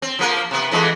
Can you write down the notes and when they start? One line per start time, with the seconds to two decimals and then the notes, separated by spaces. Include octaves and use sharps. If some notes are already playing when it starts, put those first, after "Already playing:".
0.02 C4
0.19 F3 A#3 A#4
0.51 C3 B3
0.71 F2 E3 G#3